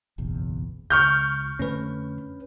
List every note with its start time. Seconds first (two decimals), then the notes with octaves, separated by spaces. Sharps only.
0.18 F#1 B1 E2
0.90 C#2 C#6 F6 G6
1.59 F2 D3 A3 C#4 B4